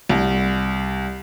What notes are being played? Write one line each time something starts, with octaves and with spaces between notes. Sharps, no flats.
C2